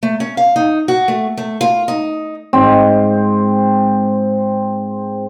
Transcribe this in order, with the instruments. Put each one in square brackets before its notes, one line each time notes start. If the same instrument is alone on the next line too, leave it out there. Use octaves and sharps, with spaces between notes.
[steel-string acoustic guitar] A3
C#4
F5
D#4
F#4
A3
A3
F4
D#4
[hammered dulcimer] G#2 C4